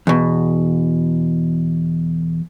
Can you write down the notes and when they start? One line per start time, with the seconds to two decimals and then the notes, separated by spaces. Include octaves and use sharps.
0.07 E2 B2